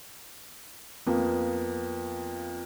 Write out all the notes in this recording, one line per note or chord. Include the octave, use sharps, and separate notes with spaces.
F2 A#3 B3